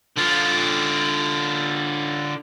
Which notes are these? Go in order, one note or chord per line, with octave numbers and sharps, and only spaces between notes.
D3 F4